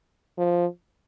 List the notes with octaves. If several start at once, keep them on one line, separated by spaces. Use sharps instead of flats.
F3